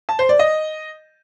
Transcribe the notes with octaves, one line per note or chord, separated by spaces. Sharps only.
A5
C5
D5
D#5